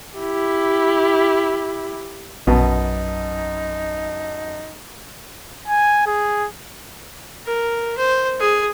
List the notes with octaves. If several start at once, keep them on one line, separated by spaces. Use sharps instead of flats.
E4 G4
A#1 F#2 B2 D#4 F#5 A5
G#5
G#4
A#4
C5
G#4